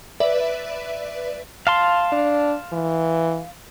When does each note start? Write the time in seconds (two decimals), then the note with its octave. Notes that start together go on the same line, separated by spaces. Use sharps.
0.20 B4 D5 E5
1.67 F5 A5 C6
2.12 D4
2.72 E3